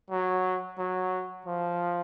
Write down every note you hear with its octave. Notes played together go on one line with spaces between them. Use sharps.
F#3
F#3
F3